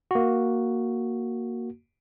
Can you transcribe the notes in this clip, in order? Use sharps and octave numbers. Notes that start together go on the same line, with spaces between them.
A#3 F#4